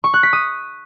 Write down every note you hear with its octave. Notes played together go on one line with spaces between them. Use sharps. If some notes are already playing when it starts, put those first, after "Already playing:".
C#6
F#6
B6
D#6